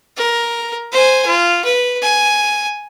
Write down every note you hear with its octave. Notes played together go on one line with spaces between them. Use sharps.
A#4
C5 G#5
F4
B4
G#5